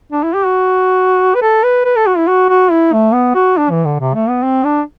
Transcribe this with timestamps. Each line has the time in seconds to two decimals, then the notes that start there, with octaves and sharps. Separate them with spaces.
0.12 D4
0.23 E4
0.35 G4
0.45 F#4
1.35 B4
1.42 A4
1.63 B4
1.85 B4
1.96 A4
2.07 F#4
2.17 E4
2.27 F#4
2.49 F#4
2.71 E4
2.93 A3
3.13 B3
3.35 F#4
3.57 D4
3.70 E3
3.85 D3
4.00 C3
4.14 A3
4.29 B3
4.43 C4
4.64 D4